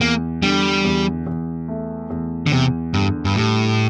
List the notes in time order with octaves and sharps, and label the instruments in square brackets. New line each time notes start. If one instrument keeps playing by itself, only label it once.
[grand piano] E2 [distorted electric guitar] A#3
[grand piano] D3 [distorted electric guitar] G3
[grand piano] E2
E2
A3
E2
[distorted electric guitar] D3
[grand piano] E2 [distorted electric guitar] C3
[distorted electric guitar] G2 [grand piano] D3
[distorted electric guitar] G2
[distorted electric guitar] A2 [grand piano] G3